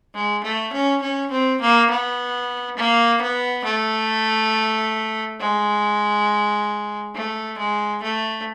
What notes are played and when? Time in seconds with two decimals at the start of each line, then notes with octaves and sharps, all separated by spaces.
0.15 G#3
0.44 A3
0.73 C#4
1.02 C#4
1.31 C4
1.61 A#3
1.90 B3
2.77 A#3
3.22 B3
3.64 A3
5.40 G#3
7.15 A3
7.58 G#3
8.03 A3